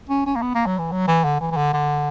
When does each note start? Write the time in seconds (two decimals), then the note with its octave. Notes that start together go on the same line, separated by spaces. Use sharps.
0.09 C#4
0.26 C#4
0.35 A#3
0.42 B3
0.55 A#3
0.66 F#3
0.78 E3
0.92 F#3
1.08 E3
1.24 D3
1.40 E3
1.51 E3
1.57 D3
1.73 D3